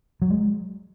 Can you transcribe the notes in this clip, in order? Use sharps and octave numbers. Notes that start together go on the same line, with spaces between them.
F#3
G#3